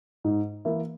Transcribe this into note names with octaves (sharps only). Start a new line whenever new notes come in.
G#2
E3 A#3 E4